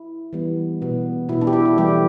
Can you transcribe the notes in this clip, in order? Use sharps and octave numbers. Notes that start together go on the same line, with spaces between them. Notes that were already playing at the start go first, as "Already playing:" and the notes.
Already playing: E4
E3 G3 B3
B2 B3
B2 B3 E4
D4
G4
E4
E4
E3 G3 A3 G4